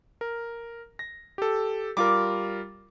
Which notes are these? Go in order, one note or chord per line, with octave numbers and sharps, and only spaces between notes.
A#4
A#6
G4 A4
G3 F4 A#4 D6